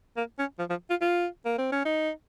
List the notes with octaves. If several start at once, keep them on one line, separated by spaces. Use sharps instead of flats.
A#3
C#4
F3
F3
F4
F4
A#3
C4
C#4
D#4